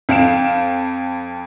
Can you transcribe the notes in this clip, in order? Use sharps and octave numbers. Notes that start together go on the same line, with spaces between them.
F2 F5 D7 E7